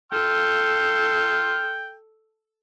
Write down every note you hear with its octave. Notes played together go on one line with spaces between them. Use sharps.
A4 G5 C6 F6